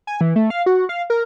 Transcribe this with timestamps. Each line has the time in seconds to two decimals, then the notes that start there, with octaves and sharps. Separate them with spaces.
0.07 G#5
0.21 E3
0.36 A3
0.50 F5
0.66 F#4
0.89 F5
1.10 A#4